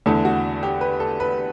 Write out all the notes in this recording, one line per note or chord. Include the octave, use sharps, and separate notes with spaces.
E2 D3 A3 E4 A4
F#4
G4
B4
A4
B4